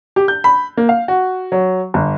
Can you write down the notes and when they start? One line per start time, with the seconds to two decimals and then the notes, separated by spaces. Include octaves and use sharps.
0.16 G4
0.28 G6
0.44 B5
0.77 A#3
0.89 F5
1.08 F#4
1.52 F#3
1.94 G1